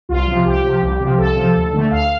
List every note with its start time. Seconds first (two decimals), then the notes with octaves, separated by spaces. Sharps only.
0.09 C2 F4
0.27 C3 F3
0.45 C2 G4
0.64 C3 F3
0.82 C2
1.00 C3 F3
1.18 C2 A4
1.36 C3 F3
1.55 D2
1.73 D3 A3
1.91 D2 F5